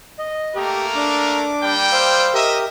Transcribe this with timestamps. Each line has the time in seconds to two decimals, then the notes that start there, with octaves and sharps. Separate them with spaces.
0.19 D#5
0.55 A3 A#3 G4 A#4
0.95 D4 D6
1.61 G3 A#3 G5
1.93 C5 F5 E6
2.34 G4 A#4 D#5 E5